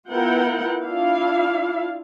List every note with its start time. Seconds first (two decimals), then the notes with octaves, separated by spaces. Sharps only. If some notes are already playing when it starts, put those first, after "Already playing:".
0.11 B3 E4 F4 A#4 F#5 G5
0.84 D4 E4 F4 F5